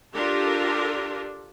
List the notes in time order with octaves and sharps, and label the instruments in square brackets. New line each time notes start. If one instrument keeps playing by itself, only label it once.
[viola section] D4 F4 G4 A4 A#4